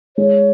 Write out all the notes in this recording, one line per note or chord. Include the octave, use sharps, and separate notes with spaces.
G#3 C#5